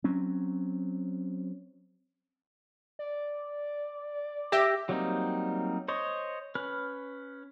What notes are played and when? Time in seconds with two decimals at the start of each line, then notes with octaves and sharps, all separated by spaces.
0.04 F#3 C4 C#4
2.99 D5
4.52 G4 E5 A#6
4.89 F#3 G3 A#3 C4 D#4
5.88 C5 C#5 D#5
6.55 C#4 B4 F6